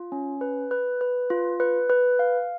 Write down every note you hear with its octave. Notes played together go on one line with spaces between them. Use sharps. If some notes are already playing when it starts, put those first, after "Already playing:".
Already playing: F4
C#4
B4
B4
B4
F4
B4
B4
F5